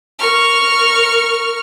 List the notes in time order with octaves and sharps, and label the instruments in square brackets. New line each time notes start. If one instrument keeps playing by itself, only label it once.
[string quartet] A#4 C#6 F6